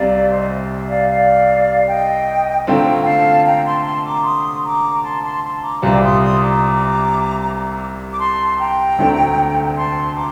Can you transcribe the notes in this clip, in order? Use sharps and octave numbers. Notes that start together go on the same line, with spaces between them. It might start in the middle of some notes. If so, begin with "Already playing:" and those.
Already playing: C2 C3 G3 D5 F5
C5 D#5
D5 F5
D5 F5
D#5 G5
D3 A3 C4 F4 G5 A#5
F5 A5
G5 A#5
A5 C6
A5 C6
A#5 D6
C6 D#6
A#5 D6
A5 C6
A5 C6
A5 C6
A#5 D6
C2 C3 G3 C4 F4 A#5 D6
C6 D#6
C6 D#6
A#5 D6
D6
A5 C6
G5 A#5
D2 D3 A3 C4
A5 C6
A#5 D6